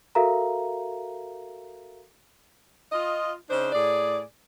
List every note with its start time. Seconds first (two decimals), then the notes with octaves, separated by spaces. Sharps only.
0.15 F#4 A4 A#4 E5 F5 A#5
2.92 F4 D#5
3.50 C#3 D4 D#4 C5
3.73 A2 G#4 D5